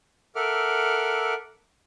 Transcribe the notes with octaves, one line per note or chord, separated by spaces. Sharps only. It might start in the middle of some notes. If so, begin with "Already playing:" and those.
A4 A#4 E5 F#5 D6 F6